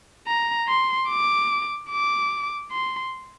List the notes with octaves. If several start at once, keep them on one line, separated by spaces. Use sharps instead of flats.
A#5
C6
D6
D6
C6